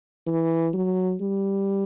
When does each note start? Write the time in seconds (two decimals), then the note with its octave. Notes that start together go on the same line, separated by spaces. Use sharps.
0.27 E3
0.74 F#3
1.21 G3